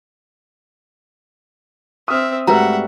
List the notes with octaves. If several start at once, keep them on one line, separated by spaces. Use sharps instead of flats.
C4 E5 D#6 F6
G#2 G3 A3 F#4 B4 E5 F#5 A#5